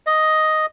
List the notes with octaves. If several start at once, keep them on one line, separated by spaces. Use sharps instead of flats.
D#5